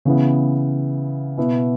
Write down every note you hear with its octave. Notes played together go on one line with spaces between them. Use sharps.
C#3 E3 B3 E4
B2 B3 E4